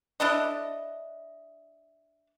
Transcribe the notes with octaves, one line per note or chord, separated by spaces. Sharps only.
D4 E4 A4 D#5